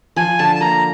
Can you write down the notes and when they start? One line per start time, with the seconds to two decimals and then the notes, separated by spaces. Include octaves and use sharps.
0.16 F3 G#5
0.39 D3 A5
0.56 A5
0.61 A#3 A#5